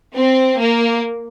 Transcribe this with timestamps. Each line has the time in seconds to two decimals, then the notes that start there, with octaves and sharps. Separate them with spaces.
0.16 C4
0.59 A#3